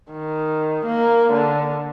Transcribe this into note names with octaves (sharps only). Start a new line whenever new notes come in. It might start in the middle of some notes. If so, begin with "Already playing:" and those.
D#3
A#3
D3